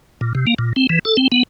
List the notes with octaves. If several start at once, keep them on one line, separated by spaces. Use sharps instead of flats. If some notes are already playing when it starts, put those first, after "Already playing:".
A#2
C3
A#3
A#2
C4
E3
A4
C4
B3